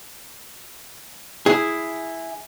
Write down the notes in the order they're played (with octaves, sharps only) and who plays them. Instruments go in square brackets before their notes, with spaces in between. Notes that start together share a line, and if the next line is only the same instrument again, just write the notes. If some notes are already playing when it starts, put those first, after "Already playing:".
[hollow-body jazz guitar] E4 G#4